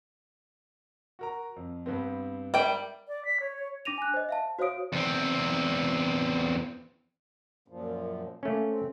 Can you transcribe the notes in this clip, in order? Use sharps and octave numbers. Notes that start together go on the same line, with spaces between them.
F#4 A#4 A#5
F2
G2 B3 C4
G3 A#4 E5 G5
D5
B6
C#5
C#5
D4 D6 A#6 D#7 F7
G#5 F#6
C5 D#5
E5 F5 A5
F#4 C5 C#5 F5 D#6 D7
E2 C4
F#2 A#2 F3
A3 A#3 C#4
C4